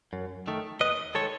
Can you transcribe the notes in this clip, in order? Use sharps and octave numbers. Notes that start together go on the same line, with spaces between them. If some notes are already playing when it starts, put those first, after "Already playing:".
F#2
D#3 A3
D#2 B4 D#5
D#3 G#3 A4 C#5